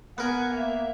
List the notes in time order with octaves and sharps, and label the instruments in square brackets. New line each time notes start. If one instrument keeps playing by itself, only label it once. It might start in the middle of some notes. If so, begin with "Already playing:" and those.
[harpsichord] B3 A#4 [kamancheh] F#5 G#5
[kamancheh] A#3 E5